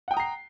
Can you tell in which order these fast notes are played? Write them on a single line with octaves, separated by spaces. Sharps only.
F#5 G5 D#6 A#5 C7